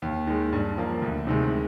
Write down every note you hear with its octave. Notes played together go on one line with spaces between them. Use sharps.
D#2
D#3 G#3
G2
F3 A#3
D2
C3 D#3 G#3